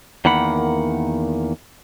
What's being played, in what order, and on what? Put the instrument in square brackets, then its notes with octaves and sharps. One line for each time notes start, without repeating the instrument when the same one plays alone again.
[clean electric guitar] E2 D#3 A#3 F#5 B5